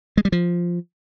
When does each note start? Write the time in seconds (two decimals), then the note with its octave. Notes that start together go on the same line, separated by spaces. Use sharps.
0.17 G#3
0.25 G3
0.32 F3